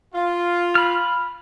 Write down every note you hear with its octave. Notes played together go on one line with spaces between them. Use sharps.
F4
B5 F6